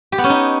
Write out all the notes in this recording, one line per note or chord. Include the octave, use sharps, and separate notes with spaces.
G4
B3
C#4
D#4